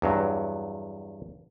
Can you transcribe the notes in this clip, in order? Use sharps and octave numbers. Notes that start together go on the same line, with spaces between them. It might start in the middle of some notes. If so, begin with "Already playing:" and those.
E2 G2 F#3